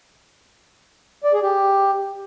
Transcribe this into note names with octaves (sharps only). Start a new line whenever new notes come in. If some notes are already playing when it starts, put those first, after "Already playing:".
D5
G#4
G4